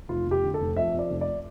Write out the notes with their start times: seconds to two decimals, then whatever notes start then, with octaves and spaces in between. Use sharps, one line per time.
0.09 F1 F4
0.26 F1 G4
0.43 D3
0.54 A4
0.60 F1
0.77 F2 E5
0.94 F2 D5
1.10 F1
1.21 D5